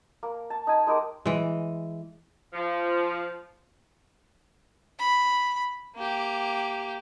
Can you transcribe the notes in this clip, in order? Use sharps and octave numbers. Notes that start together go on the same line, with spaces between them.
A#3
A5
D#4 G#5
G#3 D#4 G4 A#4
E3 G#3
F3
B5
A#3 G4